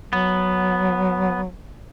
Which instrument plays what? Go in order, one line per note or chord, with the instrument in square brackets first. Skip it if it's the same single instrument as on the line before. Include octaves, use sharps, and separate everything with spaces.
[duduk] F#3 [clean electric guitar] B3